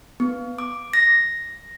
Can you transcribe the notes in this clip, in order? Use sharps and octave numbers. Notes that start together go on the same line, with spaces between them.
B3
D6
A#6